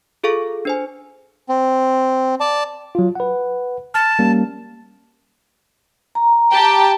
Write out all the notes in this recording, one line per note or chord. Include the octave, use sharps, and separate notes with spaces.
F4 G#4 A4 F5 C#6
D4 C5 G#5
C4
D5 A5
F#3 F4
B4 F#5
A5 F6
G3 A#3 C#4
A#5
G4 G5 A5